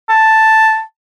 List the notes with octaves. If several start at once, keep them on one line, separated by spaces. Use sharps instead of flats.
A5